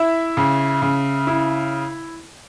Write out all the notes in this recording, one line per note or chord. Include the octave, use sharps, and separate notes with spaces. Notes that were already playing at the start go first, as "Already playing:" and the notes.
Already playing: E4 E5
C#3
C#3
E4